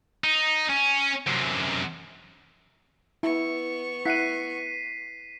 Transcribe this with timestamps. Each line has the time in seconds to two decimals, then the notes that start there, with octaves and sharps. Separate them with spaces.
0.24 D#4
0.70 C#4
1.27 F#2 C3
3.23 B3 E4 C#6
4.05 E4 F#5 B6 C7 D#7